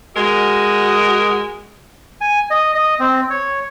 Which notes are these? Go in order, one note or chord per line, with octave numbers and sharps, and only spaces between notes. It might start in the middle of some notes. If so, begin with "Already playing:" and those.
G#3 F#4 A#4 D#5
G#5
D#5
D#5
C4
C#5